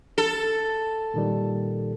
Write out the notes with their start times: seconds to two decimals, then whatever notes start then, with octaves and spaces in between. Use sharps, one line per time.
0.18 A4
1.14 A#2 D#3 G3